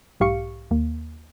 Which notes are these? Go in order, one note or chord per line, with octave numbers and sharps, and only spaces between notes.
B1 G#2 G4 F5 C#6 C#7
D#2 A#3